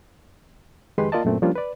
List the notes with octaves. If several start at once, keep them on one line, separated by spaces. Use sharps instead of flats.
F2 D#3 G#3 G4 B4 C6
A#3 F4 A#4 D5 D#5 A5
F#2 A#2 A3 C4
F3 G3 A#3 C#4 D4 F4
B4 D5